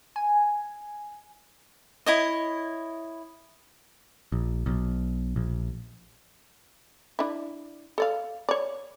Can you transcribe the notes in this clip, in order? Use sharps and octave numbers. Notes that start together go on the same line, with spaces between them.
G#5
E4 C#5 D#5
A#1
B1
A#1
D4 E4
A4 D5 F5
C#5 D5